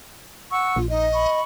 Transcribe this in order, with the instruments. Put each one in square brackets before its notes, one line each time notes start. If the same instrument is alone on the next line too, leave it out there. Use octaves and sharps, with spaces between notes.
[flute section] F#5 C#6 E6
[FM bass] A#1 [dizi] F4
[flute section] D#4 [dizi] D#5
[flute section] B5 C#6